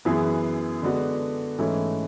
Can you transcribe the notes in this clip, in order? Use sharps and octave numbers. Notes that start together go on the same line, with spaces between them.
F#2 E3 B3 E4 G#4
D3 G#3 B3 D4 F#4
G#2 E3 A3 C#4 E4